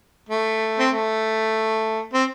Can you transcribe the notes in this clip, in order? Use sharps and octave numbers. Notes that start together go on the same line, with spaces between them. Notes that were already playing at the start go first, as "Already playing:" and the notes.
A3
C4
A3
C4